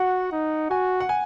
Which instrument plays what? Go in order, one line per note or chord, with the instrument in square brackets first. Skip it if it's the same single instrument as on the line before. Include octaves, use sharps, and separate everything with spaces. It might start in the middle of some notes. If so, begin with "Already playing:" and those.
Already playing: [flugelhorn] F#4 [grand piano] F#5
[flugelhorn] D#4
[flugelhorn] F#4 [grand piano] G#5
[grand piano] F#5
G#5